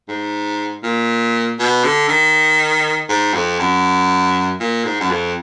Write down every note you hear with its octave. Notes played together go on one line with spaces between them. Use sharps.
G#2
A#2
B2
D3
D#3
G#2
F2
F#2
A#2
G#2
F#2
F2